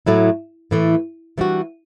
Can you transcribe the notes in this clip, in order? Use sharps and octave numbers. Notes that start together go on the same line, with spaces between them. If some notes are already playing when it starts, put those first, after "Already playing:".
A2 F#3 A3 E4
A2 E3 A3
E3 G3 D4 F#4